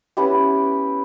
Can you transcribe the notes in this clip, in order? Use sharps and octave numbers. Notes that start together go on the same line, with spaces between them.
B3 C#4 E4 G4